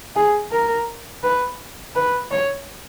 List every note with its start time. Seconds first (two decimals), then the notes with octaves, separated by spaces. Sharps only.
0.16 G#4
0.51 A#4
1.23 B4
1.95 B4
2.31 C#5